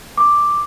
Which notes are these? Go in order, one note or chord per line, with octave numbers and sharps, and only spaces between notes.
D6